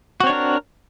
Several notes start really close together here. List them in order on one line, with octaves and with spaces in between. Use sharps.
F#4 C4 C#5 D4 A#4